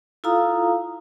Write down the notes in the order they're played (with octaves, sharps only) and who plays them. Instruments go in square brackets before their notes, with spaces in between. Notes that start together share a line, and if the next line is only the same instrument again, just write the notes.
[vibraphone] E4 F4 A4 F5 A#5 D#6